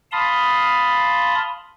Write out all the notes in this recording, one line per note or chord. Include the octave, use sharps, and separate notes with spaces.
F5 A5 B5 C6 D#6